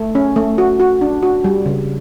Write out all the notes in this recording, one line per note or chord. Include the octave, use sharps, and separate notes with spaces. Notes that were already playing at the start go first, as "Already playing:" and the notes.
Already playing: A3
C#4
A3
F#4
F#4
D4
F#4
G3
C#3